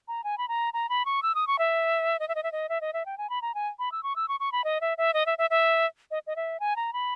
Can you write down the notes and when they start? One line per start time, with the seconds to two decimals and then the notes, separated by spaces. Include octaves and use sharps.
0.08 A#5
0.24 G#5
0.38 B5
0.48 A#5
0.74 A#5
0.89 B5
1.05 C#6
1.23 E6
1.35 D#6
1.47 C#6
1.59 E5
2.20 D#5
2.29 E5
2.35 D#5
2.43 E5
2.52 D#5
2.69 E5
2.81 D#5
2.93 E5
3.06 G5
3.18 G#5
3.30 B5
3.42 A#5
3.55 G#5
3.79 B5
3.92 E6
4.03 C#6
4.16 E6
4.28 C#6
4.40 C#6
4.52 B5
4.64 D#5
4.81 E5
4.98 E5
5.14 D#5
5.26 E5
5.38 E5
5.50 E5
6.11 D#5
6.27 D#5
6.36 E5
6.60 G#5
6.76 A#5
6.93 B5